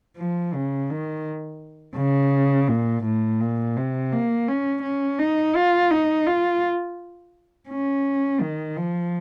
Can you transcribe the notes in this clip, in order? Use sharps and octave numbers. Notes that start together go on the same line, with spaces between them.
F3
C#3
D#3
C#3
A#2
A2
A#2
C3
A#3
C#4
C#4
D#4
F4
D#4
F4
C#4
D#3
F3